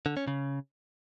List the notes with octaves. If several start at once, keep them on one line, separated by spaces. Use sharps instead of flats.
D3
C#4
C#3